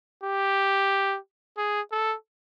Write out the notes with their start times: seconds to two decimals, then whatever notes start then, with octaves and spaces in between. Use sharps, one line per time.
0.23 G4
1.57 G#4
1.92 A4